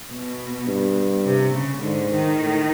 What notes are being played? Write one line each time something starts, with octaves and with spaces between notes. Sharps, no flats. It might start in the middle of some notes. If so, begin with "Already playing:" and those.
B2
G2
C3
C#3
G#2 D3
D#3
A2